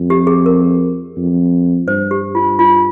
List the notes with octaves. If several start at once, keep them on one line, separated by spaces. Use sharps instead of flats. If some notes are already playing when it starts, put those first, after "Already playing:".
Already playing: F2
G4
G#4
A#4
F2
G2 C5
G4
F4
F4